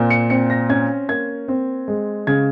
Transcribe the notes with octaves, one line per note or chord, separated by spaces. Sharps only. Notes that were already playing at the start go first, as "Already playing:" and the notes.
Already playing: A#2 C4
C#7
C4 C#7
A#6
C#4 G#6
A#3 G#6
C4
G#3
C#3 G#6